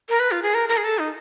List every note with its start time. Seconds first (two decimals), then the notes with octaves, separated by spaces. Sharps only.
0.10 A#4
0.20 B4
0.31 F4
0.43 G#4
0.54 A#4
0.69 A#4
0.77 G#4
0.84 A4
0.99 D#4